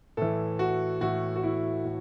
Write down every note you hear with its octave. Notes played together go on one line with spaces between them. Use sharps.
A2 E3 A4
F#4
A2 E3 F#4
F#4
E4
A2